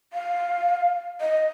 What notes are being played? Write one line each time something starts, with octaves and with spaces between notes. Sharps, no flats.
F5
D#5